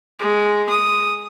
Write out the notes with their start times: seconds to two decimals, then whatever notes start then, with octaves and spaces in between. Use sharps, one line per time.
0.20 G#3
0.69 D#6